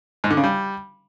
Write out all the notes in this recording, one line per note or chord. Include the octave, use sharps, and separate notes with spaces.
G#2
D3
C#3
G3